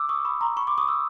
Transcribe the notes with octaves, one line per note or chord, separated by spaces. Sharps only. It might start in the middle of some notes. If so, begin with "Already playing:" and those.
Already playing: D6 E6
C#6 D#6
B5 C#6
A#5 C6
B5 C#6
C6 D6
C#6 D#6
E6